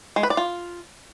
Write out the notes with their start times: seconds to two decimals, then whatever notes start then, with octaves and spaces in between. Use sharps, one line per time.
0.16 G#3
0.23 B4
0.30 D5
0.37 F4